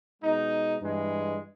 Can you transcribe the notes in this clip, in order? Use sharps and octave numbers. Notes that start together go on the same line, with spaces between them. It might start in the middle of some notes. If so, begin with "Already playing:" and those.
B2 G#3 D#4
G2 E3 G#3